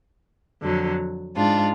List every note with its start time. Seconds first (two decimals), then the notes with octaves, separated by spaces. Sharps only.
0.62 F2 D3 F#3
1.36 G#2 G#3 D4 F4